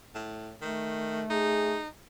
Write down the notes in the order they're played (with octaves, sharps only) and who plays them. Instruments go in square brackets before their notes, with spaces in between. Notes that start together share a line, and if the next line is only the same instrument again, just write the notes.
[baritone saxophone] A2
[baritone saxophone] D#3 [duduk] A3
[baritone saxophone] D#4 [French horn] G#4